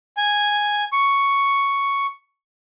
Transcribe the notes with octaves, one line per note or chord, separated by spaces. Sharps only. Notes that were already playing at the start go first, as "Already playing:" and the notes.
G#5
C#6